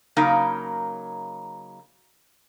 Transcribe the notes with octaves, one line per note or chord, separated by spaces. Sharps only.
C#3 F#3 A#3 D#4 A#4